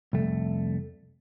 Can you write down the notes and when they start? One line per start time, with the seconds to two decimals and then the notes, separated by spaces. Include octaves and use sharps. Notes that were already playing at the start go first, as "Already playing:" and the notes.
0.13 C2 F2 A3